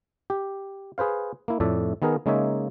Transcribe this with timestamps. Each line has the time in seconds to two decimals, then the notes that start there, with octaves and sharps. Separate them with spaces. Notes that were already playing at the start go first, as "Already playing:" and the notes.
0.30 G4
0.98 G#4 B4 C5 F5
1.48 A#3 E4
1.60 F2 A2 A3 D5 E5
2.02 D#3 B3 G#4 A#4
2.26 C#3 G#3 A#3 D#4 C#5 E5